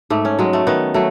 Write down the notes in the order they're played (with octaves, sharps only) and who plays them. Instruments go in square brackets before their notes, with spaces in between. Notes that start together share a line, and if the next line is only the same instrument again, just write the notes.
[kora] G#2 A3
C#4
F#3 G#3
A3
D#3 B3
F#3 A3